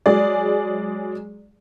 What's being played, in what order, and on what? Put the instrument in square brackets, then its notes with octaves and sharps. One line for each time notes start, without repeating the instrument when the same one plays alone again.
[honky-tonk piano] F#3 G#3 G#4 D5